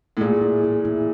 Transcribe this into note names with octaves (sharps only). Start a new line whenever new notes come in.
A2
A#2 G#4
E4
G#4
E4